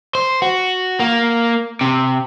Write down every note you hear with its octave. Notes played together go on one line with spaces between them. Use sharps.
C5
F#4
A#3
C3